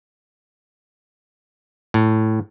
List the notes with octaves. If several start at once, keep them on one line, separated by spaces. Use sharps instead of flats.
A2